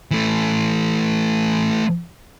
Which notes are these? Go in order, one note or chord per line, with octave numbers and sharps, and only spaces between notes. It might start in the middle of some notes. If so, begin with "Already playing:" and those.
E3 A3